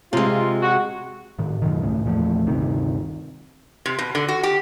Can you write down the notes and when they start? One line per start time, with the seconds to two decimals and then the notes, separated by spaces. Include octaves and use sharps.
0.13 C3 G#3 F4
0.62 F#4
1.39 A2 D#3
1.62 F#2 B2 D3 D#3
1.82 C#2 A2 C#3
2.05 E2 A#2 F3 A3
2.47 G1 D2 C3 D#3
3.86 C3
3.99 B2
4.15 D3
4.28 F#4
4.43 G4